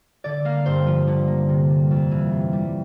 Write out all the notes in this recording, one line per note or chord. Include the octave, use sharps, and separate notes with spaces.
D3 D5
A#3 F5
G2 C5
F3
D3
A#3
C3
G3
F2
E3
C3
G3